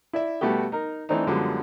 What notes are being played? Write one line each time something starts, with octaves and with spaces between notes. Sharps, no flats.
E4 D5 E5
B2 G3 A3 B3 F#4 G4
D#4 A#4
E3 A3 C4 D4 D#4
F#2 D3 F3 G3 G#3 B3